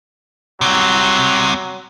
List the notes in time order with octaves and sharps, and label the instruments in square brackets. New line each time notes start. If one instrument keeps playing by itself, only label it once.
[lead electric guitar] C2 C3 [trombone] F#3